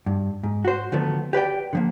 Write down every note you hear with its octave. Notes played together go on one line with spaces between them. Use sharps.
G2
G#2
F#4 C5
D3 D#3 F3 F#3 A3 B3
G4 B4 D5 G5
D3 F3 A#3